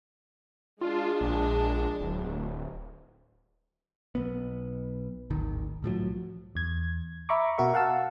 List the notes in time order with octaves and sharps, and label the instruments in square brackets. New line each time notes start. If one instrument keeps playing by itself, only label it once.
[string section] G#3 D4 [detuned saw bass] F4
[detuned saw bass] A#1
D1
[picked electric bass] B1 B3
D1 G#1 D#3
C2 A2 F3 F#3
[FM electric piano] E2 G#6
E5 A#5 B5 C#6 D6
B2 F#4 A#4 E5 C#6
F5 F#5 A5 E6